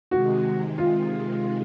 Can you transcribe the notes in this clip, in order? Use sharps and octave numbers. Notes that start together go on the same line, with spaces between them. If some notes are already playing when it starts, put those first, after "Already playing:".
C3 D#3 G#3 F#4
F4